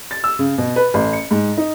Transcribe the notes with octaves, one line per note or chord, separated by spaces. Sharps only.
A6
E6
C#3
B2
B4
A1
C#7
G#2
D#4